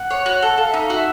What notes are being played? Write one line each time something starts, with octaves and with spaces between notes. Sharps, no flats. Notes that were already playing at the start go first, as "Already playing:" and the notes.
Already playing: F#5
C#5
F#4
A4
A4 F5
E5
D#4
F5
F#4 E5